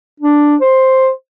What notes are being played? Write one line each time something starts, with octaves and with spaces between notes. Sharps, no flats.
D4
C5